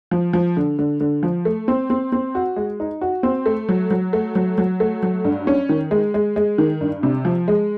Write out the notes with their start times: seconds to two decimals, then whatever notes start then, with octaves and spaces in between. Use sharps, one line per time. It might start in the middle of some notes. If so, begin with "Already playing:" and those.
0.11 F3
0.33 F3
0.57 D3
0.79 D3
1.01 D3
1.23 F3
1.45 A3
1.68 C4
1.90 C4
2.12 C4
2.35 F#4
2.56 G#3
2.80 D#4
3.01 F#4
3.23 C4
3.46 A3
3.69 F#3
3.91 F#3
4.13 A3
4.35 F#3
4.58 F#3
4.80 A3
5.03 F#3
5.25 G2
5.47 C#4
5.69 D#3
5.91 G#3
6.14 G#3
6.36 G#3
6.58 D#3
6.81 G2
7.03 C3
7.25 F3
7.48 G#3